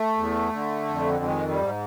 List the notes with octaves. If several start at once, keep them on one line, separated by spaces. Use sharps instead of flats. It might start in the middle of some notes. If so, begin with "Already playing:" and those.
Already playing: A3
E2
D3
F2
D#3 G#3
G3
G#2